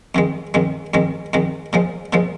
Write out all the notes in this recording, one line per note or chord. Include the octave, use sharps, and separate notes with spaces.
F2 D#3 G#3
F2 D#3 G#3
F2 D#3 G#3
F2 D#3 G#3
A#2 F3 G#3
A#2 F3 G#3